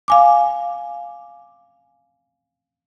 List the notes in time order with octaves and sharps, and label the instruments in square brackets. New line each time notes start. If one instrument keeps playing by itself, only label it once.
[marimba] F5 G#5 D6